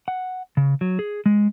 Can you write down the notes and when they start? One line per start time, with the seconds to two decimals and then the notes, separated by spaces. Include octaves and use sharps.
0.08 F#5
0.57 C#3
0.81 F#3
0.99 G#4
1.26 G#3